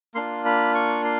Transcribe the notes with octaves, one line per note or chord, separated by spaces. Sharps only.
A#3 D4 F4 C6
B5
C#6
C6